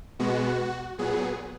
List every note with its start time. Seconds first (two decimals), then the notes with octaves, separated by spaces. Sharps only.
0.19 B2 G#3 B3 F#4
0.98 A#2 F#3 B3 G#4